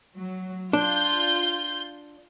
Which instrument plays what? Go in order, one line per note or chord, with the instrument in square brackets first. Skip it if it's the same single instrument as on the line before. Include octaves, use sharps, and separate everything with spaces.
[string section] F#3
[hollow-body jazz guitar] D4 [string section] F4 G6